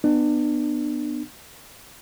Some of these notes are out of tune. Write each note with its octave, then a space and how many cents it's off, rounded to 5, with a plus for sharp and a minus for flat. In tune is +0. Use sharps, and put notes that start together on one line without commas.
B3 +0 D4 +40